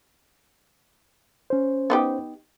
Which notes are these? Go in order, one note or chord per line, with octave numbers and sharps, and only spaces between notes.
C#4 C5
B3 D#4 G4